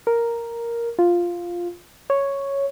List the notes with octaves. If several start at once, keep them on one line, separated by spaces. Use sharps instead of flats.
A#4
F4
C#5